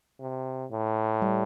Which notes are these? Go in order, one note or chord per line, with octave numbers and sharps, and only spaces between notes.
C3
A2
G3